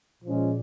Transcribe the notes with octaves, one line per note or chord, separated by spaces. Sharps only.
A#2 F3 G#3 C#4